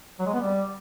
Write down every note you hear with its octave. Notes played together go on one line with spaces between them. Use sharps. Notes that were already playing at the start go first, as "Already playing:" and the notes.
F#3
G#3
B3
G3